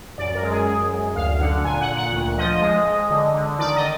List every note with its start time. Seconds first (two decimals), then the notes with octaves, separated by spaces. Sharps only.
0.18 F#2 D5
0.35 A#4
0.42 G#3
0.51 G#4
0.67 F#2
0.91 F#2
1.16 D2 F5
1.40 D3 F#5
1.64 A#2 G#5
1.81 F#5
1.89 A#2
1.97 F#5
2.13 D2
2.38 F3 D#5
2.61 G#3
2.86 G#3
3.11 D3
3.34 D3
3.59 D#3 D5
3.75 D#5